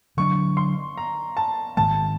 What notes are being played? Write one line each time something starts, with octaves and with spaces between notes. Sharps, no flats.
D3 F#3 A#3 D4 C#6
C6
A#5
A5
G#2 D#3 G#3 A5